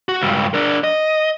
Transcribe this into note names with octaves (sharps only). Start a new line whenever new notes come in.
F#4
C#2 G2
D4 A#4
D#5